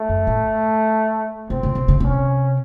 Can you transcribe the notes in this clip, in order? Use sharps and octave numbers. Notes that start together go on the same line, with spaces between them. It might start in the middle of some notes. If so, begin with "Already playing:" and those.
Already playing: A3
F#2
A2
C3 C4
C#3
C3
C#3
C3 C#4